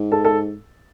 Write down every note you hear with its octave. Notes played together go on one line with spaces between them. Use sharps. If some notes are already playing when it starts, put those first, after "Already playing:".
Already playing: G#2
A4 A5
A4 A5